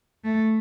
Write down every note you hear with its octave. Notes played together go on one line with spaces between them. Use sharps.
A3